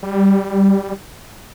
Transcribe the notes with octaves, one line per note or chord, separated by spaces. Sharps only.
G3